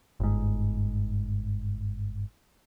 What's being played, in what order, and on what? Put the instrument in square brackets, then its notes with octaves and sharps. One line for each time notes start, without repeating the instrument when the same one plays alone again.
[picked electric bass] G1 G#2